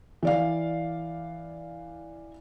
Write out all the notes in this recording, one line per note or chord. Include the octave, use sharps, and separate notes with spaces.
E3 D5 F5